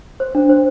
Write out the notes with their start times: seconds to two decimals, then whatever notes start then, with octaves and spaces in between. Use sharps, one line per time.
0.20 C5
0.35 D4
0.49 C5